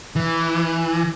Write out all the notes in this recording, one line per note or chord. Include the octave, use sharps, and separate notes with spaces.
E3